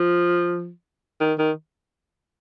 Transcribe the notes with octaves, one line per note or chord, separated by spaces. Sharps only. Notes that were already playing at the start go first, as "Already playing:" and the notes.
Already playing: F3
D#3
D#3